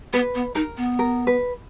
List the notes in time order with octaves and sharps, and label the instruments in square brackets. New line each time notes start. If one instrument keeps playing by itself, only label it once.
[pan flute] B3 [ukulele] B4
[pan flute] B3
[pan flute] D#4 [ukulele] A#4
[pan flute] B3
[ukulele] A#4
B4